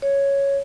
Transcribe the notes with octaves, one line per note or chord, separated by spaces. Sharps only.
C#5